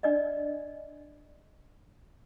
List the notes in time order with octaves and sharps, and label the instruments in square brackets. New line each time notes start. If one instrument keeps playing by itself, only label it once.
[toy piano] D4 D5 D#5